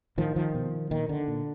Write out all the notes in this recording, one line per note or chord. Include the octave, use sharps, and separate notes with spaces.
A2 D#3 F3
D#3 F3
B2
A#2 D#3
D3
A#2